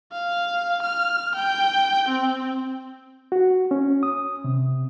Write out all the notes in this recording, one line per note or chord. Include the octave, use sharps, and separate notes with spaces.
F5
F6
G5
C4
F#4
C#4
D#6
C3